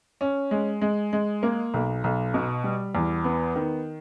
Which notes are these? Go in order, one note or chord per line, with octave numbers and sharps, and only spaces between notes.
C#4
G#3
G#3
G#3
A#3
B1
B1
B2
G3
E2
B3
D#3